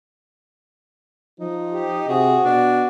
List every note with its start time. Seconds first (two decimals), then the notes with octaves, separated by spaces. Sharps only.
1.40 F3 D#4
1.73 G4
2.08 C3 F#4 G#4
2.45 B2 D4